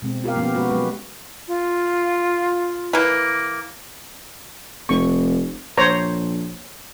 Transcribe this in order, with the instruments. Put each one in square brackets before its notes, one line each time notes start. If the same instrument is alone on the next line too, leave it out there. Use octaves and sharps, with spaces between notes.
[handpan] B2 G#3 C4
F4 G4 A#4 F5
F3 A#3 B3 C#4 G4
G#3 F#4 B4
F#3 G#3 B4
[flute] F4
[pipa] E3 A#3
[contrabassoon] F1 [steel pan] C#6
[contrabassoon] A#1 [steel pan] C5 C#5 A#5